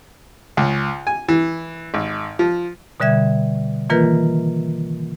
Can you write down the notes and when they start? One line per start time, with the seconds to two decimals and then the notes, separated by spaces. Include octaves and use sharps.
0.57 C#2
1.07 G#5
1.28 E3
1.94 G#1
2.39 F3
3.00 B2 D3 G3 E5 G#6
3.90 D#3 E3 A#3 F4 A#4 B4